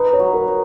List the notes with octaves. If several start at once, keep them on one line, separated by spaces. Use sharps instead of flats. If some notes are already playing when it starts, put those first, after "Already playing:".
Already playing: D#4 B4
C#5
F#3
A#4
D#4